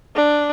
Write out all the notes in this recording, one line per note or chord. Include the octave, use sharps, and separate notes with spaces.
D4